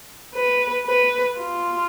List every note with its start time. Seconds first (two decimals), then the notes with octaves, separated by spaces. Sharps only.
0.35 B4
0.85 B4
1.38 F4